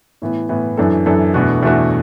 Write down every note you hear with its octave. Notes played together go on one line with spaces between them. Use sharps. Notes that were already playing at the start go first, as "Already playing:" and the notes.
A2 E3 B3
A2 E3 B3
F#2 E3 D4 A4
F#2 E3 D4 A4
E2 B2 A3 D4 F#4
E2 B2 A3 D4 F#4